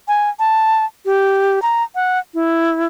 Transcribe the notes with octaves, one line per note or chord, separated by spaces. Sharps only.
G#5
A5
G4
A#5
F#5
E4